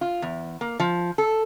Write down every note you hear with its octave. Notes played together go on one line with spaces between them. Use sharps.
F4
E2
A#3
F3
A4